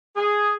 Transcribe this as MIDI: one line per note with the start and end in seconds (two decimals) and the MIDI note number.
0.17 0.53 68